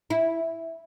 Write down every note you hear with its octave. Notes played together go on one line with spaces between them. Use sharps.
E4